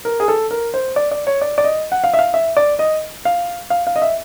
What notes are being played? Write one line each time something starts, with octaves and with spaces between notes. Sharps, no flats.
A#4
G#4
A4
A#4
C5
D5
D5
C#5
D5
D5
D#5
F#5
F5
E5
F5
E5
D5
D#5
F5
F5
F5
D#5
E5